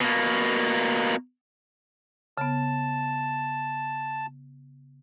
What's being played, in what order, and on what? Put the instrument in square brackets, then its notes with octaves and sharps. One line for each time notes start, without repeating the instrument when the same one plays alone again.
[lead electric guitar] B2 A#3
[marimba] C#3 B3 [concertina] A5